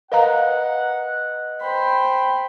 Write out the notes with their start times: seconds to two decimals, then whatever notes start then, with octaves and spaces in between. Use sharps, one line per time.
0.12 A#4 B4 D#5 F5 F#5 A#5
1.61 C5 G5 B5